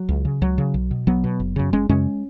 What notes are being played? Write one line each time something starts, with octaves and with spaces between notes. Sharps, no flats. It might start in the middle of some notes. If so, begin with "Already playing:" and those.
Already playing: F#3
C#2
C#3
C#2 F#3
C#3
B1
B2
B1 F#3 B3
B2
F#1
F#2 C#3
F#1 G#3 C#4
F#2 C#3 G#3 C#4